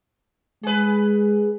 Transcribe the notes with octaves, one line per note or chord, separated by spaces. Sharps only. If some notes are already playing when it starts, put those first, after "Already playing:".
G#3 G#4 B4